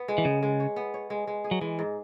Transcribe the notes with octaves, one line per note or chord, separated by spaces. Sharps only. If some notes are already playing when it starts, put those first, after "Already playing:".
Already playing: B3
G#3
E3
C#3 B3
G#3
C#5
B3
C#5
G#3
G#3
G#4
F#3
E3 G#3
G#2